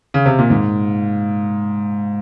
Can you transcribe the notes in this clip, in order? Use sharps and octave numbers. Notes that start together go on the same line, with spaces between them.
C#3
C3
A#2
G#2